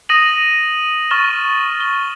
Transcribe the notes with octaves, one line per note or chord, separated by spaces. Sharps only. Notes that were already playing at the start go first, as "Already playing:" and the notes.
D#6 A#6 D#7 F#7
C#6 F6 A6 E7 G7
G7